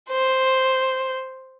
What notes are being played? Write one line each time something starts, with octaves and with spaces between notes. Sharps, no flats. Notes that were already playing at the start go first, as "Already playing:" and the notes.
C5